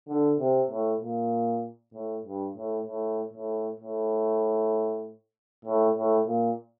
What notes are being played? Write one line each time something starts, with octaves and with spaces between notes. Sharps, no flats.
D3
C3
A2
A#2
A2
G2
A2
A2
A2
A2
A2
A2
A#2